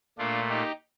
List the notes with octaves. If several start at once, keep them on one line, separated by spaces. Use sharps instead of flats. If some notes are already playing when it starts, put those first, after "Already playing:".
A#2 A3 D4 F4
D#4 G4